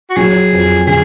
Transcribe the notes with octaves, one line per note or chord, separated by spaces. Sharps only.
F#4
F#3 G#4
F2
D3 G#4